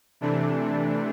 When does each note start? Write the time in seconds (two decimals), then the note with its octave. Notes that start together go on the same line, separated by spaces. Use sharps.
0.21 C3 E3 A3 D4